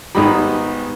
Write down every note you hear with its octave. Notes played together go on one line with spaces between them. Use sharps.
G#1 G3 B3 D#4 G#4 B5